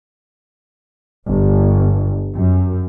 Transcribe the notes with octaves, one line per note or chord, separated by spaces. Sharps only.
G1
F#2